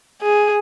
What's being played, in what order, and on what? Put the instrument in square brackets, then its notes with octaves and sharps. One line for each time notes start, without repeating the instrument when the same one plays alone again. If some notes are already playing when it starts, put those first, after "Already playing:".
[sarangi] G#4